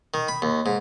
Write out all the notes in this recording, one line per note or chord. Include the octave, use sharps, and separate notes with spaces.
D#3
B5
D#2
G#2